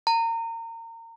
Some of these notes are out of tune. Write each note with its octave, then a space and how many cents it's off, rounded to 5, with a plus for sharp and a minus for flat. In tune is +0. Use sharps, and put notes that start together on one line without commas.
A#5 -30